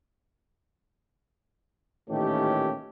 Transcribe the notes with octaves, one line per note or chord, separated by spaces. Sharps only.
A1 A#2 D#3 A3 C#4 G4